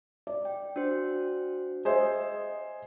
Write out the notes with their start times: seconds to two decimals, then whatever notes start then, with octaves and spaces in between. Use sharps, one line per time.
0.27 D5
0.45 G5
0.76 D4 F#4 C5
1.85 G#4 C5 D#5 E5